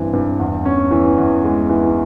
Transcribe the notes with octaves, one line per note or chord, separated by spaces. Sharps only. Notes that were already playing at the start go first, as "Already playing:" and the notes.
Already playing: G2 E3 C4
G2
E2
C#4
E3
E2
G#3
E3